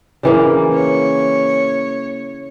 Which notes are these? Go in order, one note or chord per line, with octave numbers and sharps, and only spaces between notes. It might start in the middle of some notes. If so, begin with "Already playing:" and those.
C#3 E3 A#3
C#5